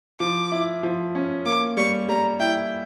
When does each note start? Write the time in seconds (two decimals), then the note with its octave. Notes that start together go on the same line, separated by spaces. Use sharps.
0.20 F3 D6
0.52 E4
0.83 F3
1.15 C#4
1.45 A#3 D6
1.77 G3 C#6
2.08 G3 A#5
2.40 E4 G5